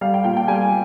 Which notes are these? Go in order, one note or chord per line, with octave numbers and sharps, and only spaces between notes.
G3 F5
G5
A#2 G5
G5
G3 G#5